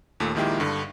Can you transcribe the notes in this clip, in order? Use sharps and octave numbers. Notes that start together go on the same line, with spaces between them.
D#2 A#2 A3
A#1 A#2 D#3 G#3 E4 G4
G2 D3